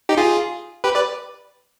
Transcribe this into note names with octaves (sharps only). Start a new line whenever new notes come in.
D#4 G4
F4 G#4
G4 B4
B4 D5